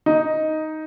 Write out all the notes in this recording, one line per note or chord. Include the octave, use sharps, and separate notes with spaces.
D#4